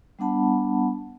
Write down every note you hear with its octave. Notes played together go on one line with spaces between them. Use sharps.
G3 B3 D4 F#5 A5 B5